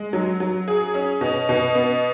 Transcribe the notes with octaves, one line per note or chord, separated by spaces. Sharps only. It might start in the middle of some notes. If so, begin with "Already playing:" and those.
Already playing: G#3
F#3
F#3
G#4
C#4
B2
B2
B3